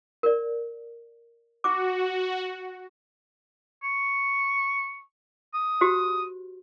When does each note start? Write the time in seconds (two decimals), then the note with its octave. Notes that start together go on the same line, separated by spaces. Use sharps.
0.23 A#4 D5
1.64 F#4 D6
3.83 C#6
5.54 D#6
5.81 F#4 G4 C5